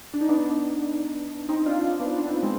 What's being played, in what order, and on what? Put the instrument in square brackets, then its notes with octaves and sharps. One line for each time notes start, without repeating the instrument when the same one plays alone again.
[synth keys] D4
D#4
B3 D4
C4 D#4
D4 F4
B3 D4
D4
C4
B3
G#3 C4